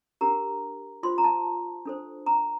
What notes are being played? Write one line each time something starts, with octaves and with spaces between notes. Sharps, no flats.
D4 G4 A#4 A#5
F4 C5 C6
A#5
A5
D4 A4 C5
A#5